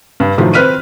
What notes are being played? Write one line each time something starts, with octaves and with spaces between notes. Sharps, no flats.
G2
A2 D#3 F3 F#3
C4 B4 F6 B6 D#7